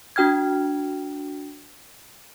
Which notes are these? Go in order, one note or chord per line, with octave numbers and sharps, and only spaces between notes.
D4 F#4 G5 F6 G#6